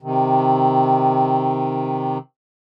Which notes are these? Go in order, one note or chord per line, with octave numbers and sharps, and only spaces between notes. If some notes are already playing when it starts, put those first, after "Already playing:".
C3 D#3